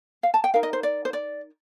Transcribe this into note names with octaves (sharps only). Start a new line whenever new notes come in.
F5
A5
G5
D#4 A#4 F5
D#5
C5
D5
C5
D5